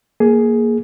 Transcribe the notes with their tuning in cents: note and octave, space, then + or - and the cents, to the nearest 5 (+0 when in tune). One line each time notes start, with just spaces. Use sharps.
A#3 +0 G#4 +10